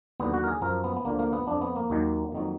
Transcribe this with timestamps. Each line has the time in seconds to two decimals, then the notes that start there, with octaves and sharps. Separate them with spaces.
0.20 D#2 D3 F#3 B3
0.34 F#4
0.44 A#4
0.48 G#4
0.62 F#2 F3 A#4
0.84 B3
0.97 B3
1.05 D2 D3 F3 A#3
1.19 A#3
1.33 B3
1.47 F2 F3 D4
1.62 B3
1.76 A#3
1.90 D#2 D#3 F#3
2.32 F2 D#3 F#3